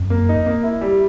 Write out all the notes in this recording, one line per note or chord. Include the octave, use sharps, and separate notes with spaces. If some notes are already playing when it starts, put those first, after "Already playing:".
Already playing: F#2
A#3
D#4
A#3
E4
G3